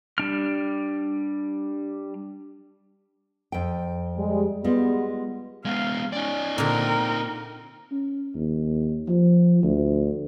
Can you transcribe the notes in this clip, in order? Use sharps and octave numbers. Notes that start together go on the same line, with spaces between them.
G3 D4 F6
F2 G5
G3 G#3
G3 G#3 B3 F4
G#3 B3 F5
C#4 D#4 D5
A#2 D3 C4 A#4
C#4
D#2
F3
D2